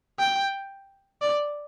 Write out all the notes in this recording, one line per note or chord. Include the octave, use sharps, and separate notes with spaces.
G5
D5